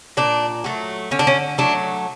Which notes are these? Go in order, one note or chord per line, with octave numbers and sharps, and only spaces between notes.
A#2 D4
F#3 A3
D3 C#4
D4
C#4
F#3 A3 D4